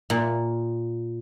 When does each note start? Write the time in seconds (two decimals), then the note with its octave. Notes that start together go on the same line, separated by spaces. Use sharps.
0.10 A#2